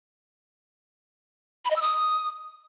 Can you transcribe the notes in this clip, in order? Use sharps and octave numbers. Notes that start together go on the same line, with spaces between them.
B5
D#5
E6
D#6